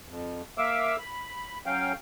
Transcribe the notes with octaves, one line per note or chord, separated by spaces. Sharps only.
F2
A#3 E5 F5 D6 E6
B5
F#3 C#4 F5 G5